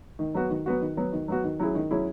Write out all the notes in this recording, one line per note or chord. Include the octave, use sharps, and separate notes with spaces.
D#3
F#3 B3 F#4
D#3
F#3 B3 F#4
D#3
F#3 B3 F#4
D#3
F#3 B3 F#4
D#3
F#3 C#4 E4 G#4
D#3
F#3 C#4 E4 G#4